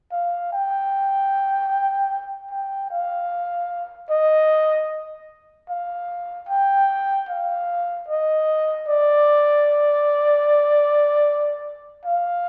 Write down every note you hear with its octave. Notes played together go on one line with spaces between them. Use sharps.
F5
G5
G5
F5
D#5
F5
G5
F5
D#5
D5
F5